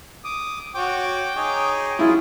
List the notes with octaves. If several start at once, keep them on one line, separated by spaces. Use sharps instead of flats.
D6 D#6
F#4 C#5 G5 D6
D#4 G#4 C#5
F#3 E4 F4 G#4